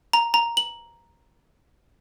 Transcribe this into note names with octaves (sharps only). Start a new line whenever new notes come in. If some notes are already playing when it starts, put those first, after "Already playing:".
A#5
A#5
F#7